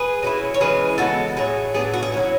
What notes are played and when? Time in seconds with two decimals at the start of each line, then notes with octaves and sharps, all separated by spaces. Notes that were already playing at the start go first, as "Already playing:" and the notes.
Already playing: G#4 B4
0.23 F#3 C#4 E4
0.54 C#5
0.60 E3 G#3 C#4 E4 G#4 B4
0.98 C#3 E3 G#3 B3 F#4 A4
1.37 A2 F#3 A3 G#4
1.74 A2 F#3 B3 D4 G#4
1.94 F#4
2.03 G#4
2.12 F#3 C#4 E4